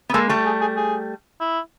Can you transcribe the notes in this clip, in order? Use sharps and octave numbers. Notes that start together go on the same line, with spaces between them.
B3
G#3 A#3 A4
G3 A3
G#4
G#4
G#4
E4